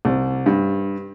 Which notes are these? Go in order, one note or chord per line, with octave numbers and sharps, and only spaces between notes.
C2
G2